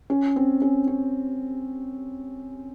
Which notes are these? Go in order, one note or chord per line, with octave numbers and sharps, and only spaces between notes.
C#4
C4
C#4
C#4